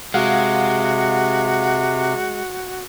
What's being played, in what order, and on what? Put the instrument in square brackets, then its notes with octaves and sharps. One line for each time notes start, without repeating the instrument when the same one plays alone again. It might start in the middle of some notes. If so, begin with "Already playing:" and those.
[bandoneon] C3 [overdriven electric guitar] G#3 [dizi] F#4 [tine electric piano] F5 F#5